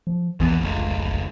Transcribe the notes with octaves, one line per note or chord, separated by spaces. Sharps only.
F3
A#1 D#2 E3 B3
F1 C#2